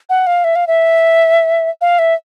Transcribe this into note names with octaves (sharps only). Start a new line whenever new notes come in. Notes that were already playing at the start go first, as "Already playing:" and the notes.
F#5
F5
E5
F5
E5
F5
E5